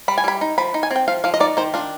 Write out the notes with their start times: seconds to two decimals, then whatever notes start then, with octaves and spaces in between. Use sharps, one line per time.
0.08 G3 B5
0.18 G#5
0.24 G3 B5
0.41 D#4
0.58 F3 B5
0.74 D#4
0.83 G#5
0.91 C4 G5
1.08 F3 F5
1.24 F3 F5
1.34 D#5
1.40 D#4 D5
1.57 D#3 C5
1.74 D4 F4